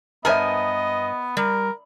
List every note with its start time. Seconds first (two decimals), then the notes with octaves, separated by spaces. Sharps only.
0.25 G2 B3 A#4 C5 D#5 E5 G#5
1.37 G3 A#4